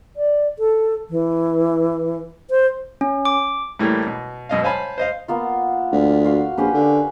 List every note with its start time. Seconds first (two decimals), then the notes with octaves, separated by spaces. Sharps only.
0.16 D5
0.59 A4
1.10 E3
2.50 C5
3.01 C#4
3.25 D6
3.79 A2 E3 G3 A3 A#3
4.07 B2
4.49 F#2 B2 D#5 F5
4.63 C5 C#5 F5 G#5 A5 B5
4.98 C5 D#5 F5
5.28 A#3 B3 F4
5.92 D2
6.25 F#4 F5 C6
6.57 A#1 C#4 G4 B4
6.74 D3